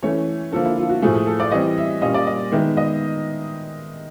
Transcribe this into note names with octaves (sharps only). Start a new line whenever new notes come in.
E3 A3 C#4 C#5
D3 F3 A#3 A4
E4
F4
F#4
A2 F3 A3 G#4
G#4
A4
D5
E3 G3 C4 D#5
E5
A#2 G3 A#3 C#4 D#5
D5
D#5
D#3 G#3 B3 E5
D#5